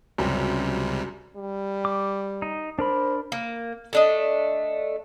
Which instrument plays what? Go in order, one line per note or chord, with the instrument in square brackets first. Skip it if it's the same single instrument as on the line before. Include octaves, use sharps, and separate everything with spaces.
[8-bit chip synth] C#2 C3 G3 [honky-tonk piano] F#2
[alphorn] G3
[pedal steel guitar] D6
D#4
[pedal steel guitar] D4 A#4 B5 [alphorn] C5
[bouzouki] A#3
A3 D4 D#5